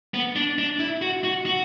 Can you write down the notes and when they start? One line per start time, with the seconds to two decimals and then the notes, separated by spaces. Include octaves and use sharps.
0.14 B3
0.36 D4
0.58 D4
0.80 E4
1.02 F#4
1.24 F#4
1.46 F#4